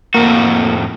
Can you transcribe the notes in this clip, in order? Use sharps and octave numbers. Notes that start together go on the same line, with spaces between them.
F2 A2 A#3 F#4